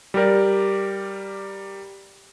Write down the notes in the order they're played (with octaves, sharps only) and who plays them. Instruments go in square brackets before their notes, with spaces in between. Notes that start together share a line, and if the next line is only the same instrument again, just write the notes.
[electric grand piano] G3 G4 A#4 D5